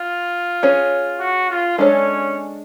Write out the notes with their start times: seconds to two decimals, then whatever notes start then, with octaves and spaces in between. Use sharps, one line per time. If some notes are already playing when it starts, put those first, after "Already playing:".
Already playing: F4
0.63 C#4 G#4 C#5
1.20 F#4
1.49 F4
1.78 G#3 C#4 D4 F#4 A4 C#5